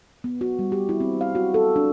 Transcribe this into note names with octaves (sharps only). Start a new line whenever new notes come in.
B3
F#4
G3
G4
E4
C4
F5
F#4
A4
D4